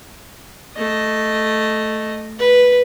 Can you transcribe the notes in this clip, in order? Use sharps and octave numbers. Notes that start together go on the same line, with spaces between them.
A3 D#5
B4